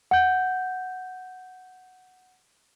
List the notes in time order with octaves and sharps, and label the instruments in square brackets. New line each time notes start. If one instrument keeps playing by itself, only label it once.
[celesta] F#5 G6